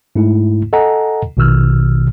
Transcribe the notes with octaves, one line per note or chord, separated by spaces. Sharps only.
G#2 A3 E4
A4 D#5 F#5 G#5 A#5
A#1 B2 D#3 E6 F6